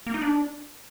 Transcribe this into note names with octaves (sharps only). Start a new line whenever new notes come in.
A#3
D#4
D4